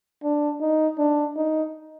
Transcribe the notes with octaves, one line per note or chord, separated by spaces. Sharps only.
D4
D#4
D4
D#4